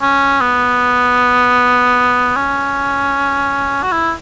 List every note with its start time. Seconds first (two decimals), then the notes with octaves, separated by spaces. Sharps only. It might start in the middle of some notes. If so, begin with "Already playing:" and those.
0.02 C#4
0.41 B3
2.36 C#4
3.83 F#4
3.92 E4